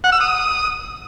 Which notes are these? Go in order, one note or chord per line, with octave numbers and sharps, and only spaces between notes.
F#5
E6
D#6